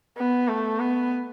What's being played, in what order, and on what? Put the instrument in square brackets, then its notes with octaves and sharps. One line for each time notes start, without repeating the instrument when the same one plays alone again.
[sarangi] B3
A3
B3